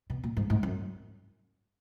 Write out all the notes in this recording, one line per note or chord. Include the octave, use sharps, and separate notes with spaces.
B2
A#2
G#2
G#2
F#2